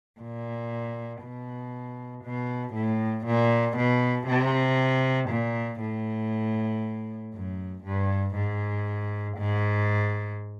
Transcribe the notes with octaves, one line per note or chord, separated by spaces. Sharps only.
A#2
B2
B2
A2
A#2
B2
C3
A#2
A2
F#2
G2
G#2
G#2